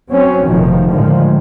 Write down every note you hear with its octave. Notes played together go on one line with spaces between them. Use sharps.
F#3 C4 C#4
F1 B2 D#3 F3
A2 D3 D#3 F3 G#3